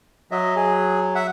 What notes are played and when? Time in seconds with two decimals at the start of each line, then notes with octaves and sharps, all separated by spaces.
0.31 F#3 D#5 E5
0.56 G#4
1.15 E5 F#5